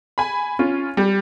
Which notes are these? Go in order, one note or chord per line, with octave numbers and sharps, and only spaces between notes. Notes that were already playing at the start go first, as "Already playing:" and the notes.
G#5 B5
C#4 F4
G3